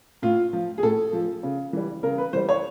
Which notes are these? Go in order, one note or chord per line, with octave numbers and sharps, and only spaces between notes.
A2 F4
F3
G#4
A2 A4
F3
C#3
E3 G3
C#3 A#4
B4
E3 G3 C5
C#5